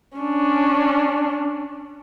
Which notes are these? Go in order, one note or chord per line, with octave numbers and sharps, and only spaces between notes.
C#4 D4